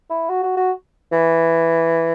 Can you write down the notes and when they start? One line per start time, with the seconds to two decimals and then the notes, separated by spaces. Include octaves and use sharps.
0.10 E4
0.30 F#4
0.43 F#4
0.57 F#4
1.12 E3